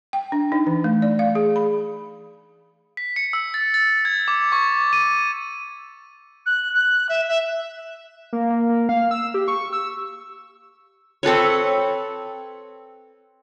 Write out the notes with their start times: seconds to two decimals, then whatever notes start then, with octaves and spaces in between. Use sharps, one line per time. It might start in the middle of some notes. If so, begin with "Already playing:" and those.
0.13 G5
0.32 D4
0.52 D#4
0.67 E3
0.84 A3
1.02 D5
1.19 F5
1.35 G#4
1.56 B5
2.97 B6
3.16 C#7
3.33 E6
3.54 A6
3.74 A6
4.05 G#6
4.28 D6
4.52 C#6
4.93 D#7
6.46 F#6
6.74 F#6
7.09 E5
7.28 E5
8.33 A#3
8.50 A#3
8.69 A#3
8.89 F5
9.11 E6
9.34 G4
9.48 C#6
9.73 E6
11.23 C4 A4 B4 C#5